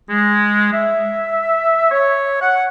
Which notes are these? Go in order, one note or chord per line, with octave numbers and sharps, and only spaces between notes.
G#3
E5
C#5
F#5